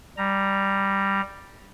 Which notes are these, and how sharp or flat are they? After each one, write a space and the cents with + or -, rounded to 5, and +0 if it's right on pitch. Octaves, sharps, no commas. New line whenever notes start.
G3 +0 A#5 +0